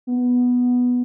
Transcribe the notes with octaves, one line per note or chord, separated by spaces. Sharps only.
B3